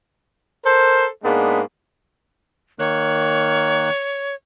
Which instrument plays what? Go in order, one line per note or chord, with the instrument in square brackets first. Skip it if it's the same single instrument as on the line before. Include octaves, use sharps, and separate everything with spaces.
[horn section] A4 A#4 C5
G#2 G#3 A#3 B3 D4
[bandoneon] D#3 A#3 F#6 [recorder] C#5